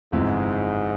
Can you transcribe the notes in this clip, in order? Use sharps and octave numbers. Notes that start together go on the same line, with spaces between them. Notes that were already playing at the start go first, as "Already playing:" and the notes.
G1 F2 G#2 C3 E3 G#3